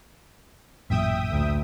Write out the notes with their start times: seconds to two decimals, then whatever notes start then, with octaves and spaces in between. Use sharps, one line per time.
0.90 A1 F#2 A#2 E5 G5 D#6
1.31 D2